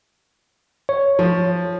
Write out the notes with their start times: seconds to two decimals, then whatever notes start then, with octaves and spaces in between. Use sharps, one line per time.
0.89 C#5
1.19 F3